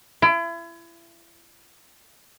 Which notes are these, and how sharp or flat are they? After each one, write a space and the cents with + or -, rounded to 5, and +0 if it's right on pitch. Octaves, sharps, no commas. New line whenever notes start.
E4 +35